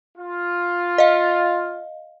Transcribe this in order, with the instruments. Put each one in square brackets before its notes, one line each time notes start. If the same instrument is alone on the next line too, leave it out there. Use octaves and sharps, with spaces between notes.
[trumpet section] F4
[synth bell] D#5 F5